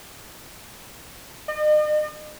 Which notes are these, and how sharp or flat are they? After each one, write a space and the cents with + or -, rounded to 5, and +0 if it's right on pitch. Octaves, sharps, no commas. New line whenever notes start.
D#5 -40